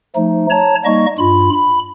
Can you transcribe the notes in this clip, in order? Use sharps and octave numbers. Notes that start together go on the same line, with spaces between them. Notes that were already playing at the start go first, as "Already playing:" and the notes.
F3 A3 D#4
C#5 A5 A#5
G3 A#3 D#4 D#5 C#6
G2 F4 B5
B5